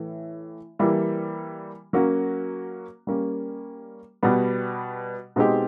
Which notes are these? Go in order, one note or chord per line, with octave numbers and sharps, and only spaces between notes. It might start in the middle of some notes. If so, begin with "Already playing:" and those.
Already playing: A2 E3 A3
E3 G3 A#3
F#3 A#3 C#4 F#4
G3 A#3 C#4
B2 G3 B3
B2 G#3 C4 D#4 G4